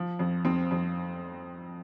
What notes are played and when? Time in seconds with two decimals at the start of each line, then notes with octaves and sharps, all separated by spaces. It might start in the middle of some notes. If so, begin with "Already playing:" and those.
Already playing: F3
0.19 F2
0.45 F2 C4
0.71 F2